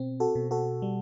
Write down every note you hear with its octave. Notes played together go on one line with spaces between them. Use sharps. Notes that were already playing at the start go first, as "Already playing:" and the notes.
Already playing: B2 C4
F#4 A4
B2
F#4 A4
G3